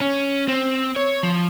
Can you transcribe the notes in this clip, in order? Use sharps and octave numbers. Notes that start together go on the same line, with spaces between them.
C#4
C4
C#5
F3